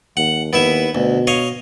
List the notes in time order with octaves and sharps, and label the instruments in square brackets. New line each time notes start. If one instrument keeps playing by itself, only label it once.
[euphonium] D#2 [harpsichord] F#5
[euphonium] D#2 [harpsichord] B3 E4 E5
[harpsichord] D2 [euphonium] B2
[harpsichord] C#5 D#5 F5